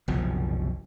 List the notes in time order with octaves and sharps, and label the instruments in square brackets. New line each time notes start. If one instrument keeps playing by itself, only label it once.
[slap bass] F#1 C2 B2 F3